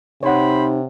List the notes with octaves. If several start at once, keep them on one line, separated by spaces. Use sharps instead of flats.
C3 D#4 C5 C#5 F#5 B5